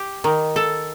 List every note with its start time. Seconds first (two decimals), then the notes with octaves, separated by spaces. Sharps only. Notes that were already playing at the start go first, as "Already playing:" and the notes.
Already playing: G4
0.24 D#3
0.56 A4